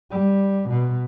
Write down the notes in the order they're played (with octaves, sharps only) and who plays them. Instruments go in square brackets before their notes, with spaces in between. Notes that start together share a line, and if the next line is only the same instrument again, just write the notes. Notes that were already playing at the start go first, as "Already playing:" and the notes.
[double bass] G3
B2